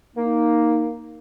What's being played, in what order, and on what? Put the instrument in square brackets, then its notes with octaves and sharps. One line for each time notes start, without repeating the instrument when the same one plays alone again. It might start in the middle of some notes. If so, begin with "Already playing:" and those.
[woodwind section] A#3 D#4